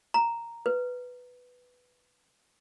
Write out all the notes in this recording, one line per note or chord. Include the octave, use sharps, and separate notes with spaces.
A#5
B4